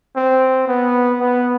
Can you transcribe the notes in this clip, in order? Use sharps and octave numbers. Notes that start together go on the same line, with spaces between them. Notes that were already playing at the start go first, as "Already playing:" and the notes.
C4
B3
B3